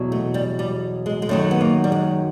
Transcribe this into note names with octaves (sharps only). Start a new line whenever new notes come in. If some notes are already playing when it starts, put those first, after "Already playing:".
Already playing: E2 B2 F#3
A3
G3
G3
G#3
G#3
F#2 D#3 F#3 A3
B3
A#3
G3
G#3